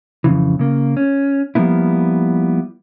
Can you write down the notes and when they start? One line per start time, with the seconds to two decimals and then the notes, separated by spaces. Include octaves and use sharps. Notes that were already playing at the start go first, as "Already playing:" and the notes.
0.24 F2 G#2 C#3 E3
0.59 C#3 A#3
0.97 C#4
1.55 F3 G3 A#3 B3 E4